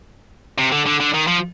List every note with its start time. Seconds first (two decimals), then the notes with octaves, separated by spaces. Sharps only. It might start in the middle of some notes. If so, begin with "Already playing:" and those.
0.58 C3
0.72 D3
0.86 D3
1.00 D3
1.14 D#3
1.28 F3